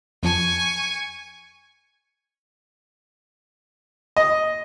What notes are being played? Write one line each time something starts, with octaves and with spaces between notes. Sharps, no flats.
F2 F3 G#5 A5 C#6
D#5